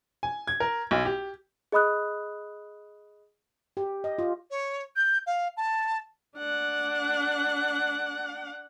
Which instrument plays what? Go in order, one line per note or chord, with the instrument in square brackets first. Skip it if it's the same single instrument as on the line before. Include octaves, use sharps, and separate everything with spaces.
[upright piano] G#5
G#6
A#4
B1
G4
[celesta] G#4 D#5 B5 D#6 F#6
[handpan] G4
D#5
F4
[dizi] C#5
G6
F5
A5
[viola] D4 F#5